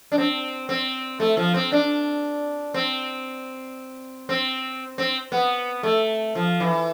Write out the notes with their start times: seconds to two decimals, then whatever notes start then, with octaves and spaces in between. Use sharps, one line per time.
0.12 D4
0.18 C4
0.69 C4
1.20 A3
1.37 F3
1.54 C4
1.72 D4
2.74 C4
4.29 C4
4.98 C4
5.32 B3
5.83 A3
6.35 F3
6.60 E3